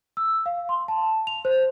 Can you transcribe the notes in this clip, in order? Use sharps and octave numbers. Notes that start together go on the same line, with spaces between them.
E6
F5
C6
A5
F7
C5